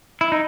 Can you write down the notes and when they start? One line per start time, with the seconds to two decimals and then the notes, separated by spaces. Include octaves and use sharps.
0.21 E4
0.32 D#4